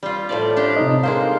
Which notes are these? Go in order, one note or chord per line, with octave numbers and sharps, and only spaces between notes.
G3 F4
A2 F3 D5
D4 G4
C3 D#4 D#5
G#3 A#3 C5 F5